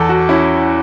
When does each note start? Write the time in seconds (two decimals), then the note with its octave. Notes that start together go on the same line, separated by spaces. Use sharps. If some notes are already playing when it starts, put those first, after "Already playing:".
Already playing: E2 A4
0.09 F#4
0.29 C#4 E4